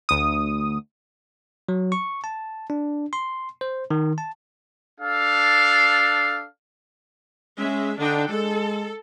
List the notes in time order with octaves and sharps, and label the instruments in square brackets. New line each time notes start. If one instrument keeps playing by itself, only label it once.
[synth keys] D2 D#6
[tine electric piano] F#3
C#6
A5
D4
C6
C5
D#3
A5
[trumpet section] D4 A4 F5
[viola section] G#3 E5 [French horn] C#4
[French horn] D3 [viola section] D4 D#4 G5
[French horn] G#3 [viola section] A4